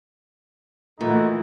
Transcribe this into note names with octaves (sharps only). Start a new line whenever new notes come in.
A#2 E3 A3 D#4 E4 F#4